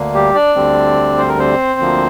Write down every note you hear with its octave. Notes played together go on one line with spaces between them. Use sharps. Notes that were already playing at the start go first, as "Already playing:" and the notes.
Already playing: D2 D3 A#3
G3 G4
D4 D5
D2 D3 G3 C4
C5
A#4
C4 C5
D2 D3 F3 A#3